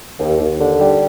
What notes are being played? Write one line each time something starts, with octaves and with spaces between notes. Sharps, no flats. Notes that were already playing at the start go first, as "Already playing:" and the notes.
D#2
D#2
D3
G3